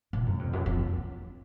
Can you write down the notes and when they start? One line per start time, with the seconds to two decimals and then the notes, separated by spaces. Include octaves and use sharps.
0.13 A#2
0.26 F#2
0.39 F2
0.53 F#2
0.66 F2